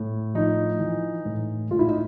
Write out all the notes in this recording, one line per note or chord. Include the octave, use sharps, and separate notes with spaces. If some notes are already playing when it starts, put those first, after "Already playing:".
Already playing: A2
F3 D#4
E3
A2
A2 F4
E4
D#4